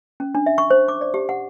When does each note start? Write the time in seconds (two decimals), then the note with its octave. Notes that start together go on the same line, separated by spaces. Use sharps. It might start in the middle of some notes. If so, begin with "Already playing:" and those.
0.20 C#4
0.35 D4
0.46 E5
0.58 C#6
0.70 C5
0.88 D6
1.01 D5
1.14 G4
1.29 F#5